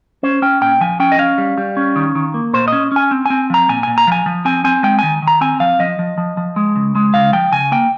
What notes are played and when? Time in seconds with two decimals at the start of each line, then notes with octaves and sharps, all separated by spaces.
0.23 C#4 C5
0.42 C#4 G5
0.61 A#2 G5
0.81 F3 G#5
1.00 C#4 G5
1.12 D#5
1.18 C#4 F5
1.38 G3
1.58 G3
1.77 C#4
1.96 D#3
2.15 D#3
2.34 A#3
2.53 A#2 C5
2.68 C#4 D#5
2.92 C#4 G#5
3.11 C4
3.26 C4 G#5
3.50 F3 A#5
3.69 A#2 G#5
3.83 A#2 G#5
3.98 A#5
4.07 F3 G#5
4.26 F3
4.45 C4 G#5
4.64 C4 G#5
4.83 G#3 G5
4.99 D#3 G#5
5.22 D#3
5.27 A#5
5.41 C4 G#5
5.60 F3 F5
5.80 F3 D#5
5.99 F3
6.18 F3
6.37 F3
6.56 G#3
6.76 C#3
6.95 G#3
7.14 C#3 F5
7.33 F3 G5
7.52 C#3 G#5
7.72 A#3 G5